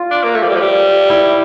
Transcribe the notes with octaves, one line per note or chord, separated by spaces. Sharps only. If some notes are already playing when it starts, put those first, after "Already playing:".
Already playing: F4
D4
A#3
A3
F3
G3
F3
G3
E4